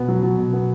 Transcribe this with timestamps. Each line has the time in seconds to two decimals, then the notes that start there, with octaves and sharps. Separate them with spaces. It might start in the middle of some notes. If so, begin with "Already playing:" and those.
Already playing: B2 B3
0.08 F#3
0.23 F#3
0.38 B2
0.53 B3